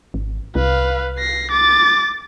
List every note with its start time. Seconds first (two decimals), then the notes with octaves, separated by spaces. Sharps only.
0.14 G#1
0.55 C2 B4 F5
1.19 A#6 C7
1.51 D6 A6